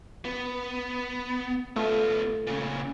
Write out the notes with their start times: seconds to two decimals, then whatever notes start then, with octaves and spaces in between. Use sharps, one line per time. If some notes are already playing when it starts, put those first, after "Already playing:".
0.25 B3
1.76 A3 B3 F4
2.47 A#2 C#3